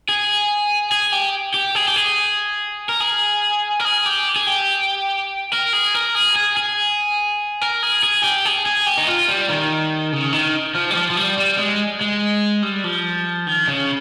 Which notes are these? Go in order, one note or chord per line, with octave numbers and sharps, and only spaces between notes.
G#4
G#4
G4
G4
G#4
G4
G#4
A#4
G#4
A#4
G#4
G4
G#4
G4
A#4
G#4
A#4
G#4
G#4
G#4
A#4
G#4
G#4
G4
G#4
G#4
G4
D#4
F4
G3
D#3
C#3
D#3
F3
G3
F3
F3
G3
G3
G#3
G#3
G3
F3
D#3
C#3